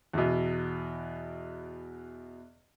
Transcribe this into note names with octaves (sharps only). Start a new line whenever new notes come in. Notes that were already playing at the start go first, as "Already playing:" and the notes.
E2 B2